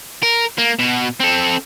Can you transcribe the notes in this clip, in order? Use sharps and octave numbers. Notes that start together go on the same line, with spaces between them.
A#4
A#3
B2
C4 A4